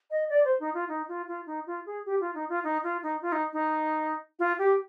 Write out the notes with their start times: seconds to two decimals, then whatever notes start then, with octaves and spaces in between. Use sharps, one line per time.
0.11 D#5
0.29 D5
0.45 C5
0.60 D#4
0.74 F4
0.88 D#4
1.08 F4
1.28 F4
1.46 D#4
1.67 F4
1.86 G#4
2.05 G4
2.20 F4
2.35 D#4
2.49 F4
2.64 D#4
2.83 F4
3.03 D#4
3.22 F4
3.32 D#4
3.53 D#4
4.39 F4
4.58 G4